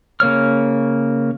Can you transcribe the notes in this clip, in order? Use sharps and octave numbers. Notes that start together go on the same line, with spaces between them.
C#3 A#3 C#5 F6